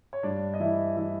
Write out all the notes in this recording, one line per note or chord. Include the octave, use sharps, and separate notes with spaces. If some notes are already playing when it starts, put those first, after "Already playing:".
C#5
G2 D4 D5
D#5
E3 E4 E5
E3 E4 E5